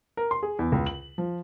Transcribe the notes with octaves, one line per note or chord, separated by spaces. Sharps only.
A#4
C6
G#4
E2
C#2
F#7
F3